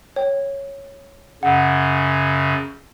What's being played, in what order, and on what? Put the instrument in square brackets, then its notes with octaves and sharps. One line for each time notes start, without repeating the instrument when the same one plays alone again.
[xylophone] C#5 G5
[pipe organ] F#2 C#3 [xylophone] F#5